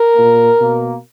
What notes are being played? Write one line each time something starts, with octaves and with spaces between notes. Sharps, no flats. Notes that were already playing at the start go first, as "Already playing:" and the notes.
Already playing: A#4
A#2 A#3
B2 A#3